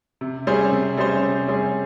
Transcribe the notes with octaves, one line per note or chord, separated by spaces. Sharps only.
C3
G3 C#4 G#4 C5
C3
G3 C#4 G#4 C5
C3
G3 C#4 G#4 C5